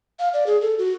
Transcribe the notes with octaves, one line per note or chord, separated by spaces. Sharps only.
F5
D5
G#4
A4
F#4